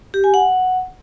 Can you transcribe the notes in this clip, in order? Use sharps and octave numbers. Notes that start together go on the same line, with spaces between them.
G4
G#5
F#5